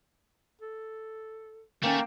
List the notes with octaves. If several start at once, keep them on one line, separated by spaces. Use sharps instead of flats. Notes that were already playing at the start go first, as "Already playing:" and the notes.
A4
D#3 A3 A#3 C#4 G5